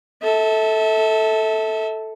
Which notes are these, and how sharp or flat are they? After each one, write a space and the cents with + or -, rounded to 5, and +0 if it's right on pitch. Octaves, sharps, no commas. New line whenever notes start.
A4 +0 E5 -30